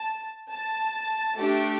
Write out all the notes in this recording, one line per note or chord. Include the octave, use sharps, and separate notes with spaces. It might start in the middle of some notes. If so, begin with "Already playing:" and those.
Already playing: A5
A5
A3 D4 G4